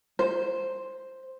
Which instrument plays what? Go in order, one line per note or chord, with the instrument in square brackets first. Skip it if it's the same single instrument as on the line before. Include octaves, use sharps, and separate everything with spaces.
[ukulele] C5